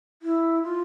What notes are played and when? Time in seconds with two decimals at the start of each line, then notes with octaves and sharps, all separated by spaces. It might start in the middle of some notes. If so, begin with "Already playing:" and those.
0.22 E4
0.63 F4